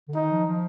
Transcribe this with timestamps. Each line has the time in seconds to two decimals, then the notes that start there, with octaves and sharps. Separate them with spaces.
0.08 D3
0.15 D#3 D#4
0.31 F3
0.47 F3